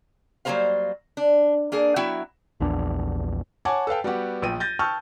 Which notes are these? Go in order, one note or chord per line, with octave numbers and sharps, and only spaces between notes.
F#3 G3 A#3 A#4 C5 F5
D4
A#3 D4 G#4
F#3 B3 E4 F#4 E5 G5
A#1 E2 D4
C#5 F#5 G#5 A5 D6
A4 B4 F5 G5
G3 B3 F#4 G4 F#5
A#1 F3 G5 D#7
G6 A6 A#6
G5 A5 C#6 E6 F6 G6